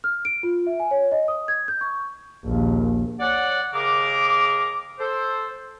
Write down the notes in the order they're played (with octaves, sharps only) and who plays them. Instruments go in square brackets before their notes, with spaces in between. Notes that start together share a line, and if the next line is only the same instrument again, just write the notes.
[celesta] F6
D7
F4
E5
G#5
C#5
D#5
D#6
G#6
G6
C#6
[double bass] A#1 D#2
[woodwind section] C#5 D5 F#5
D#2 C#3 G#4 A#4 D6
A4 C5